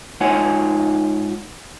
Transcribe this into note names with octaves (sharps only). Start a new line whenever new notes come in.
G#2 D#4 F4 C#5 F#5 G#5